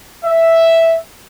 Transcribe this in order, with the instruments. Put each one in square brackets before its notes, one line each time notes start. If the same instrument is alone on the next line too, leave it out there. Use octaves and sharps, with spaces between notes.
[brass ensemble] E5